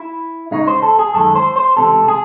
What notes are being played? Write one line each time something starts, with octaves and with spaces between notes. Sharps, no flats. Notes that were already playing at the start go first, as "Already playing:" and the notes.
Already playing: E4
C#2 C#3 G#3 D#4
C5
A4
G#4
F#2 D#3 G#3 A4
C5
C5
C#2 C3 E3 A4
G#4